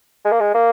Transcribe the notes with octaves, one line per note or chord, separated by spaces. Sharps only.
G#3
A#3
G#3
A#3